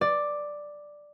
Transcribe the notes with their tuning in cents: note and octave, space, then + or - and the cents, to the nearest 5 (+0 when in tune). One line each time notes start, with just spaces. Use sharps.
D5 +5